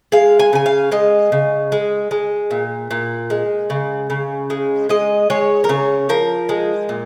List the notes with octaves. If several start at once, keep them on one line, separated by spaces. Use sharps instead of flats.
G#3 F5
G#5
C#3 G#5
F5
G#3 D#5
C#3
G#3
G#3
A#2
A#2
G#3
C#3
C#3
G#3
G#3 D#5
G#3 C#5
A#4
C#3 C#5
F3 A#4
G#3
A#2